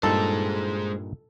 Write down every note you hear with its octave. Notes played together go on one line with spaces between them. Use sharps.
G2 A#2 G#3 D#4 A4 C5